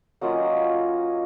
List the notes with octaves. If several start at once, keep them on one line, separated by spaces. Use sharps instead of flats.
F#3 A#3 C#4 F4 D#5 F#5